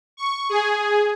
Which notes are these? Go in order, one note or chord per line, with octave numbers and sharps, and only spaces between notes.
C#6
G#4